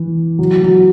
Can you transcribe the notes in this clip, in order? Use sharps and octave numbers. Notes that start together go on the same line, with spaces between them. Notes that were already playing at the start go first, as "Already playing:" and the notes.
Already playing: E3
F#3
F#3